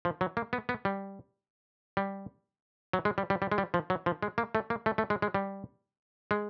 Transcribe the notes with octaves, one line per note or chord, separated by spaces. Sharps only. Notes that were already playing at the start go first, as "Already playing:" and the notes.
F3
F#3
A#3
B3
B3
G3
G3
F#3
G#3
G3
G3
G3
G#3
G3
F3
F#3
F3
G#3
A#3
A3
A#3
A3
A3
G#3
G#3
G3
G#3